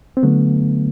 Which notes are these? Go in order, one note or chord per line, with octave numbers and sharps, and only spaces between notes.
C4
D3 F#3 A3 B3